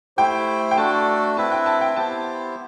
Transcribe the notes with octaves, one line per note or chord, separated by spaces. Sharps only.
A3 E4 G4 C5 G5
G5
A3 D4 F#4 A4 A5
C4 E4 B4 E5 A5
G5
A5
G5
B3 E4 G4 C5 A5